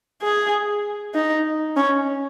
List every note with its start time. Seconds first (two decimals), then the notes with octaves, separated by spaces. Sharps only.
0.22 G#4
1.15 D#4
1.76 C#4